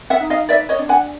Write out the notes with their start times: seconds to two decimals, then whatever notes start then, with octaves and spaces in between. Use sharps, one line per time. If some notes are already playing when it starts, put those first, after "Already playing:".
0.10 E5 F#5
0.20 D#4
0.30 D#5 F5
0.49 B4 D5 E5
0.69 C#5 D#5
0.79 D4
0.89 F#5 G#5